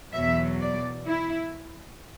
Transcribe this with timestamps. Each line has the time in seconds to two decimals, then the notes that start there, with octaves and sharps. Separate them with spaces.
0.13 E2 B2 F#3 E5
0.60 D5
1.06 E4